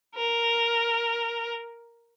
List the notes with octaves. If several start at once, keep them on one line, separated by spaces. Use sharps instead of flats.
A#4